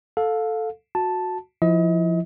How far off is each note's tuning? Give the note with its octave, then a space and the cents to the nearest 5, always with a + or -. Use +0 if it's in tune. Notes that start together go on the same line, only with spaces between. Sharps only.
A4 +0 F5 +20
F#4 -15 A5 +0
F3 -10 E4 +0 D#5 +35